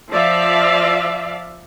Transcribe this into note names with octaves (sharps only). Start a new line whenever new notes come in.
F3 D5 E5 F5